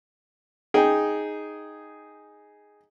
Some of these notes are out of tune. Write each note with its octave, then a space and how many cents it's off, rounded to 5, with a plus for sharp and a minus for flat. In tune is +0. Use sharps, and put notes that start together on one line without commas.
D#4 +0 G#4 +0 G5 +0